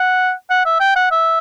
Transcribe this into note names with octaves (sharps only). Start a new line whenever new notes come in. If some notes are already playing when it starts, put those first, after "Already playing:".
Already playing: F#5
F#5
E5
G5
F#5
E5